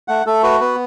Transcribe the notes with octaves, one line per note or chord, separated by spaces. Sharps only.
A3 F#5
A3 A4
F#4 B4
B3 B4